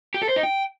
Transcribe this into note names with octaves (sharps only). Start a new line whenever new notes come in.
G4
A4
C5
D#4
G5